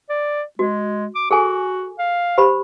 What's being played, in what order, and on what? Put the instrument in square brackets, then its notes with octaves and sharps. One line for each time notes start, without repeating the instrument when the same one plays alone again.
[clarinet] D5
[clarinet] G#3 [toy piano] F#4
[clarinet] D6
[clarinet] F#4 [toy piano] G#4 A4 G#5
[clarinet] F5
[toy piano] G4 C5 B5